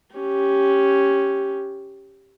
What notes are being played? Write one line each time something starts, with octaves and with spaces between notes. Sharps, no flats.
C#4 G4